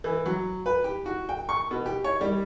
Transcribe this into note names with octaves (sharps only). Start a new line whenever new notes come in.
E3
F#3
B4
G4
F#4
G5
C#6
B2
G4
C#5
G3